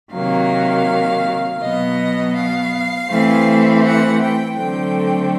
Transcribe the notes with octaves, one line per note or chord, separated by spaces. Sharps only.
C3 D#3 F#3 A#3 F5
B2 F#3 B3 D#5
F5
E3 A3 C4
F#5
G5
D3 F#3 A3 C4 G5